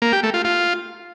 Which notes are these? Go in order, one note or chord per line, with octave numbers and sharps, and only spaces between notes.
A#3
G4
A3
F4
F4